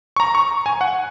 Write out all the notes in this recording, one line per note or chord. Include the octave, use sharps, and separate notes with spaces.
C#6
A#5
C#6
G#5
F#5